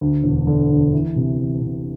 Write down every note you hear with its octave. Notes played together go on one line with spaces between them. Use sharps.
D2
E1
D3
D2
E3
C3
E3
C3